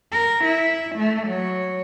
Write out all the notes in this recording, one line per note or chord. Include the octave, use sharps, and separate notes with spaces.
A#4
E4
A3
F#3 C#5